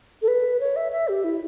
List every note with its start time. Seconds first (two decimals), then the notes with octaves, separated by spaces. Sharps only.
0.22 A4
0.28 B4
0.60 C#5
0.76 E5
0.92 E5
1.08 G4
1.24 E4